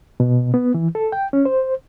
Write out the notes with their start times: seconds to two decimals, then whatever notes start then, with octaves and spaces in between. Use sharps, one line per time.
0.20 B2
0.54 B3
0.74 E3
0.95 A4
1.12 G5
1.33 C#4
1.45 C5